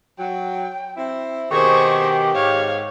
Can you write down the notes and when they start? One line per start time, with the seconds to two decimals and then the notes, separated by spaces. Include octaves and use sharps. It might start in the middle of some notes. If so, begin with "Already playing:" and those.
0.19 F#3 G5
0.97 C4 E4
1.51 B2 D#3 G4 G#4 C5 C#6
2.35 G#2 C#5 F5